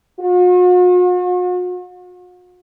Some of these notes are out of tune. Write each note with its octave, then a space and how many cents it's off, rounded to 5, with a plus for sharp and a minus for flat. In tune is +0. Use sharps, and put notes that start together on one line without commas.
F#4 -45